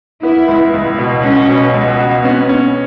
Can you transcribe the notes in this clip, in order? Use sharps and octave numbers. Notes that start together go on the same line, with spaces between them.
B3 E4
C#2
C#2
B2
C#2 C#4
B2
C#2
F#4
B3 C#4
C#4